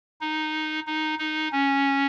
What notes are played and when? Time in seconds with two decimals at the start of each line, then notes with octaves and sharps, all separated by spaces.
0.21 D#4
0.87 D#4
1.19 D#4
1.52 C#4